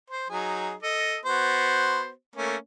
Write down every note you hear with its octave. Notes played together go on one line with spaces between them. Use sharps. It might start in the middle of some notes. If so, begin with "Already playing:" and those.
C5
F#3 D#4 G#4
A4 D#5
B3 F#4 C5
A3 A#3 C#4